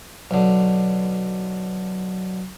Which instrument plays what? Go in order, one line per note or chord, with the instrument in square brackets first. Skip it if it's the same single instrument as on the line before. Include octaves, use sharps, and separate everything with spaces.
[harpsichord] B1 D3